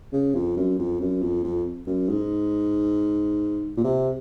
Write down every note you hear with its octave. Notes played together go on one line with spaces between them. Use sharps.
C#3
F2
F#2
F2
F#2
F2
F2
F#2
G#2
A#2
C3